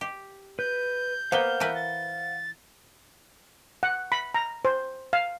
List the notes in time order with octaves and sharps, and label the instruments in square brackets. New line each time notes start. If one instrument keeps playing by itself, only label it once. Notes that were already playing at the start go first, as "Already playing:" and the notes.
[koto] G4
[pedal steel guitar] B4 [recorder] G6
[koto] A#3 B3 [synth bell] C5 G7 [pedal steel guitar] F5 F#5 F6
[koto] E3 A#4 B4
[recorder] A6
[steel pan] F#5
B5
A#5
C5
F5